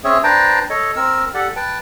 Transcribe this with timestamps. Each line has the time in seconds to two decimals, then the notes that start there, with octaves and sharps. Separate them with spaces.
0.04 C4 C#4 G#4 C#5 E5
0.24 D4 B4 C5 G5 A5 A#5
0.70 A4 C#5 D#5
0.96 C4 A#4 E6
1.34 G4 A4 D5 F#5
1.56 B4 G5 A5